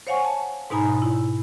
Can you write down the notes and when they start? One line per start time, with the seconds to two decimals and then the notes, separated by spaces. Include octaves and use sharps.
0.07 C5 C#5 F5 F#5 G#5 C#6
0.24 A5
0.70 G#2 B2 D#4 G#5 A#5 B5
1.02 E4